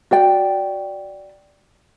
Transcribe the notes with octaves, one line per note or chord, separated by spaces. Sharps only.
F#4 D5 G5